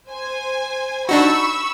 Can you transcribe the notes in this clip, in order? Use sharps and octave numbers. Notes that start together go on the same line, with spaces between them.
C5 G#5
D4 D#4 F#4 B5 C#6 E6